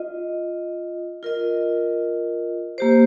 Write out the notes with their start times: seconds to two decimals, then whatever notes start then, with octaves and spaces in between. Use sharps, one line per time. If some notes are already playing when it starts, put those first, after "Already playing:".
Already playing: F4 D#5
1.23 F4 A#4 D#5
2.78 A#3 G4 C5